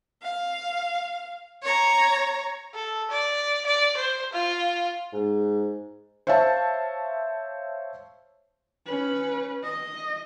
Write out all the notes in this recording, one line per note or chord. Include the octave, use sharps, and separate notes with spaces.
F5
C#5 A#5
A4
D5
D5
C5
F4
G#2
C5 C#5 E5 F5 A5
C#4 B4
D#5